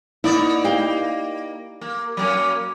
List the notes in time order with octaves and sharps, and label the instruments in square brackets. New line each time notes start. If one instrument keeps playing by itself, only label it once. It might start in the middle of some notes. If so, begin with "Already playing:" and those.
[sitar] A#3 D#4 D5 [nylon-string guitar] E4
[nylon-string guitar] G4 F5 G5
[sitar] A#3
F#3 A#3 C#4